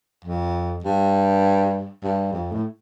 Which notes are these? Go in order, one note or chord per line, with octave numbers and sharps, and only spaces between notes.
F2
G2
G2
F2
A2